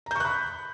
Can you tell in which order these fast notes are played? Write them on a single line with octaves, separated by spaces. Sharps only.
A#5 G6 C#6 F#6 B5